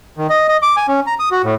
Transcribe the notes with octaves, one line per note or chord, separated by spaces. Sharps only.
D#3
D#5
D#5
D6
G#5
C#4
A#5
D#6
F#4
A2